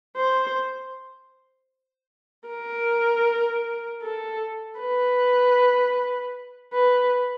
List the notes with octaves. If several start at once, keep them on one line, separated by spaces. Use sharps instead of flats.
C5
A#4
A4
B4
B4